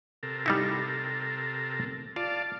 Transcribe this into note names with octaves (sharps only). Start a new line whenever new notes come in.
C3 A4 A#4
G3 D#4 E4
F4 D5 F5 A5